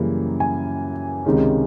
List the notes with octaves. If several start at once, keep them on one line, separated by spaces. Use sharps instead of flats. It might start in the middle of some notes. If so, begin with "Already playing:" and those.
Already playing: F#2 C#3 E3 G3 A#3
G#5
C#2 C3 D#3 G#3 C#4